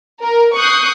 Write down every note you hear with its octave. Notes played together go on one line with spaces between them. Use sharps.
A#4
C#6 D#6 F#6 G6 C7 C#7